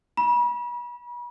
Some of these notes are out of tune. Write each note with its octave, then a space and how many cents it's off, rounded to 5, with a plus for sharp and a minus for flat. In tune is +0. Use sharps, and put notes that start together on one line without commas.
B5 -35